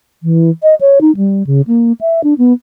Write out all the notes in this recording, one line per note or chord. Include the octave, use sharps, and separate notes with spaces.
E3
D#5
C#5
D#4
G3
C#3
A#3
E5
D4
B3